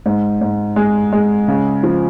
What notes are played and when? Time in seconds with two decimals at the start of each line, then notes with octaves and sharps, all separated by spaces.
0.06 G#2
0.41 G#2
0.76 G#3
1.12 G#3
1.48 C#3
1.83 F3